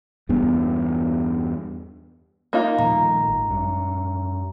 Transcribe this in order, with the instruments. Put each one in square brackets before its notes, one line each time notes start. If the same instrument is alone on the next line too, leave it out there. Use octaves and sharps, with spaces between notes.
[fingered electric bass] E2 G2 B3
[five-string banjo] A#3 D#4 F4
[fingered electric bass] A#2 D#3 F3 [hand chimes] A#5
[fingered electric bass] G#1
F#2 G3